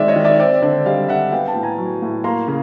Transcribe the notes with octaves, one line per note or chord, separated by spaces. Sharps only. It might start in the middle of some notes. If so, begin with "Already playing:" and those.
Already playing: D#3 G#3 C4 D5 E5
C#5 D#5
D#3
D5 E5
C4 D5 E5
D3 C5 D5
G3 D#5 F5
D3 E5 F#5
B3 F5 G5
G5 A5
A2
G#5 A#5
F#3
A2
A#3 A#5 C6
C#3